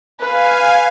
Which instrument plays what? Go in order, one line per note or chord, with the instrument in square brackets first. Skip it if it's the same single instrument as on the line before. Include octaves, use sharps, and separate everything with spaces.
[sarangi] B4 [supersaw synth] F5 G#5